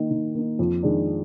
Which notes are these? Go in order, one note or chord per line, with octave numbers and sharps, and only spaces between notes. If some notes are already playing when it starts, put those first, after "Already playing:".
Already playing: D#3 A#3 D#4
D#3
A#3 D#4
F2
D#3 G#3 D4